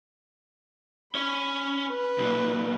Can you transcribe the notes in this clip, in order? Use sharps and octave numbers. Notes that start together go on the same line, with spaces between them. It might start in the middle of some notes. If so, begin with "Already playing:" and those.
C#4 C#5 B5
B4
B1 A#2